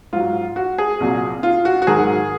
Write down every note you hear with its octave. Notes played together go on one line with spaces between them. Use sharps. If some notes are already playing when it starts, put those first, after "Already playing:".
G#2 F#3 F4
F#4
G#4
C2 A#2 F#3
F4
F#4
F#4
G#2 D#3 F#3 G#4